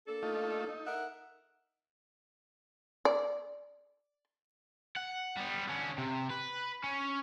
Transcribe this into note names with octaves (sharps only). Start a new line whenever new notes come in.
A#3 D4 A4
A3 D#4 F4
D#4
A#4 E5 F#5
D5
F#5
G3 B3
D3 C#4
C3
B4
C#4